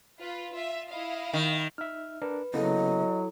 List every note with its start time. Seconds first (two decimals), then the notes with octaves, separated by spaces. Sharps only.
0.21 F4 B4
0.54 F4 E5
0.91 E4 D#5 F5
1.33 D#3
1.78 D#4 E5 F6
2.22 D4 A#4 B4
2.54 C#3 F#3 A#3 B3 E4 A4 D#5